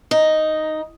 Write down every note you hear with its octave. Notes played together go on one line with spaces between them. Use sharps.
D#4